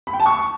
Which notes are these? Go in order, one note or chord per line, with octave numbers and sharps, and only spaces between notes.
B5
G5
A5
C#6